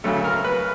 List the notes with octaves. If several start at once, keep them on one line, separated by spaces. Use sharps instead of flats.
D2 C#3 F#3 A3 A4
A#4
B4